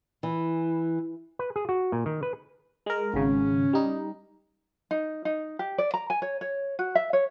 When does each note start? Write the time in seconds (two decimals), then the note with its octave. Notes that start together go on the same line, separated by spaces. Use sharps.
0.23 E3
1.39 B4
1.56 G#4
1.69 F#4
1.92 A#2
2.06 D#3
2.23 B4
2.86 G#3 A#4
3.14 G#1 C#3 C#4
3.73 G3 D#4
4.91 D#4
5.25 D#4
5.59 G4
5.78 D5
5.94 A#5
6.10 G#5
6.22 C#5
6.41 C#5
6.79 F#4
6.95 E5
7.13 C#5